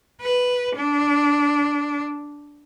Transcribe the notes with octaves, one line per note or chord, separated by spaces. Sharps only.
B4
D4